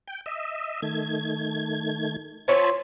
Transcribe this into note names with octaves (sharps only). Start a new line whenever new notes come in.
G5
D#5 E5
D#3 A3 G#6
C4 F4 C#5 G#5 A5 B5